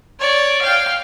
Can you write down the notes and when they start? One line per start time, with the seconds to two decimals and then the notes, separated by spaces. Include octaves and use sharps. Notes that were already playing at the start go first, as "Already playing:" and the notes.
0.19 C#5 D5
0.62 F5 G5